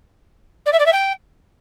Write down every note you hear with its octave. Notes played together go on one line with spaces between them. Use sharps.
D5
E5
D5
E5
G5